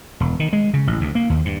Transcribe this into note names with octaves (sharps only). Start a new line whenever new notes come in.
E1
D#3
G#3
C#3
A1
D2
A#3
D#2
G2